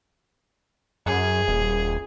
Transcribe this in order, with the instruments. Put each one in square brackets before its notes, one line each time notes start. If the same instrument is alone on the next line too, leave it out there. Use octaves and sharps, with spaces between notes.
[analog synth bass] F#2 [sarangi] G#4
[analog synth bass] D#1